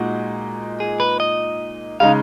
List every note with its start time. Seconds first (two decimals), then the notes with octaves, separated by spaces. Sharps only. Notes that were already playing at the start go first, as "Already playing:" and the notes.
Already playing: A#2 G#3 D#4 F#4
0.80 G#4
1.00 B4
1.20 D#5
2.00 C#3 G#3 D#4 F5